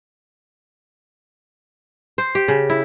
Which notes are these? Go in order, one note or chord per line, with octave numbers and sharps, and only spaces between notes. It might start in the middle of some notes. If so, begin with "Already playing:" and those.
C5
G4
C#3
E4